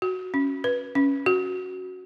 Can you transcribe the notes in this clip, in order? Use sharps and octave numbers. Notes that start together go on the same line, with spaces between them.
F#4
C#4
B4
C#4
F#4